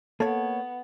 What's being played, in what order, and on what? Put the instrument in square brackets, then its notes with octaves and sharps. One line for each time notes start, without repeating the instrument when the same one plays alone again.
[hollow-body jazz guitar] A#3 C#5 [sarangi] B3 [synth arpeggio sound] A4 A5